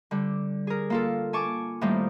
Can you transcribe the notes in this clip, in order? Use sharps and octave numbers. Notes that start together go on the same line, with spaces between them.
D3 G3
G#4 A#4
A#3 F4 A4
G#5 A5 C#6 D6
A2 D#3 G3 A#3 C4